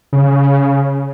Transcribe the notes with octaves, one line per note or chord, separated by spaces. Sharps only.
C#3